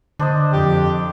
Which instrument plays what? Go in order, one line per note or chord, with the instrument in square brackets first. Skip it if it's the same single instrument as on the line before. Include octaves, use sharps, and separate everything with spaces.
[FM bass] D3 [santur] D4 C5 D#5
[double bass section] F2 [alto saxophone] G4